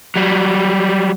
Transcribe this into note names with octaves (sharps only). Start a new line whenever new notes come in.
F#3 G3